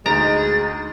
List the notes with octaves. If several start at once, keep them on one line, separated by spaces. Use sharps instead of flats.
D2 G#3 D#4 A#5 A6 D7